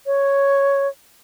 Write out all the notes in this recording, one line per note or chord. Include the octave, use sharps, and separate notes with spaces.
C#5